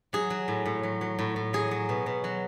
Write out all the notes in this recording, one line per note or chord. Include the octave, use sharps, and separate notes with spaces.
F#3 G#4
F#3
A2
A2
F#3
F#3
A2
A2
F#3 G#4
F#3
B2
B2
F#3